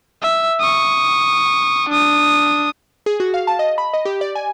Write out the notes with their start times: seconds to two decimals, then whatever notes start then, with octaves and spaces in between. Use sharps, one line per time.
0.22 E5
0.60 C#6 D#6
1.89 D4 D#6
3.06 G#4
3.20 F#4
3.34 F5
3.47 A5
3.59 D#5
3.78 B5
3.93 D#5
4.05 G4
4.21 D5
4.35 G#5